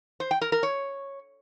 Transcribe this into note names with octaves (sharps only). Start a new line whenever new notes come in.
C5
G5
A#4
A#4
C#5